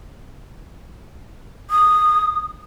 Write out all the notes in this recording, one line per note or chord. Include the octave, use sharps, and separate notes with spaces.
D#6